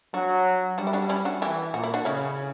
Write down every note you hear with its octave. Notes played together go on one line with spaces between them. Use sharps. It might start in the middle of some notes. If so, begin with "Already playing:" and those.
F#3 D4 F#4
G3 D4 F#4
E4
D4 F#4
C#4 E4
D4 F#4
E3 E4 G4
A#2 F#4
E4
D4 F#4
C#3 C#4 E4